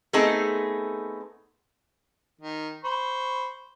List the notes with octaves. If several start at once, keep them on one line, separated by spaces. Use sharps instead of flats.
A3 B3 C4 D#4 G#4 A4
D#3
C5 B5 C#6